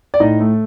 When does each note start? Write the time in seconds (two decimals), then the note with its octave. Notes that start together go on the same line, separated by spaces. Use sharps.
0.14 D5
0.20 A2 D#4 D#5
0.40 A3